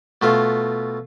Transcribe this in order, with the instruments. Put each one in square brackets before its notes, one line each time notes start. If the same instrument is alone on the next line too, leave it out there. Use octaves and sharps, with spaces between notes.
[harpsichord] B2 A3 F4